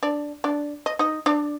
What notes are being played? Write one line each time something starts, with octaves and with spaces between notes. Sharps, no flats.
D4 D5
D4 D5
D#5
D#4 D#5
D4 D5